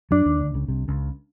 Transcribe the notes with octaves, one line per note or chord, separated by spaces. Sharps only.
F#2 F#3 D4
D#2 D#3
D2 D3
C#2 C#3
C2 C3
C#2 C#3